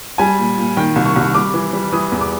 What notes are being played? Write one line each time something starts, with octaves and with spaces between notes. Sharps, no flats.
G3 G#5
A#2
A#2
D#3 G5
C2
C#6
C2 C#6
G3 D6
E3
G3
E3 D#6
E2
D6